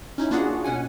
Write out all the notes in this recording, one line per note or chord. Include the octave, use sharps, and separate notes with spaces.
C#4 D#4 E4
A#3 D4 F4 F#4 G#4 F#5
B2 C#4 F#5 G#5